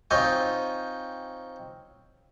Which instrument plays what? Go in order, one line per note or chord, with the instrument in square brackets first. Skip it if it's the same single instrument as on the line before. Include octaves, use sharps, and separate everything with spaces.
[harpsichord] C4 D#4 F4 C#5 G5 G#5